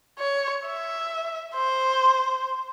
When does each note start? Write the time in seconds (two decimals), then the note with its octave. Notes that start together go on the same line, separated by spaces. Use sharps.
0.19 C#5
0.66 E5
1.55 C5